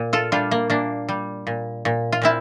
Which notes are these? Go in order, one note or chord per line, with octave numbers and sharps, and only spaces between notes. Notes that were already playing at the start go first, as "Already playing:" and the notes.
Already playing: A#2
F4 A4
G3 D4 F4
A#3
A#2 A#3 D4
G3
A#2
A#2
F4
A#2 C4 E4